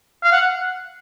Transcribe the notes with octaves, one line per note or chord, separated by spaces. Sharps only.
F5
F#5